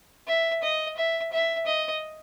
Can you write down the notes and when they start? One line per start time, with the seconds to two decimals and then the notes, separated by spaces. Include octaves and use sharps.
0.28 E5
0.63 D#5
0.97 E5
1.32 E5
1.66 D#5